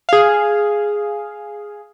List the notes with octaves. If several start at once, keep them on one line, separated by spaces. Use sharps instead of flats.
G#4 F5